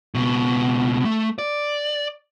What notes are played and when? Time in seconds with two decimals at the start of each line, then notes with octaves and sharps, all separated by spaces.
0.15 C#2 B2
1.05 A3
1.38 D5